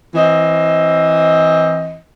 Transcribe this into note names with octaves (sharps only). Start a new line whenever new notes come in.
E3 C4 D#5